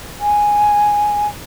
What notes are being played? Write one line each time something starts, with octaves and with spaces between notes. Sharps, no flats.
G#5